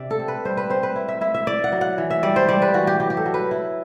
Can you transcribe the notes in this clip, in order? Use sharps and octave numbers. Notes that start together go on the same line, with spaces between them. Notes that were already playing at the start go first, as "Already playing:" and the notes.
Already playing: C3 D4 D5 E5
A4
C4
B4
G3 C5
B4
C4 C5
B4
E4
E5
E4 E5
E5
E4 D5
F#5
F#3
F#5
E3
E5
G3 D5
C5
G3 D5
B4
E3 F#4
G4
F#3 G4
G4
A4
F#3
B4
E4